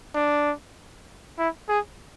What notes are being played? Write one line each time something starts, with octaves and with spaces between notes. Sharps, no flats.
D4
E4
G#4